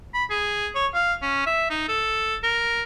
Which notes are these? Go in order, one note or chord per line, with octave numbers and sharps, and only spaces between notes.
B5
G#4
C#5
F5
C#4
E5
D#4
A4
A#4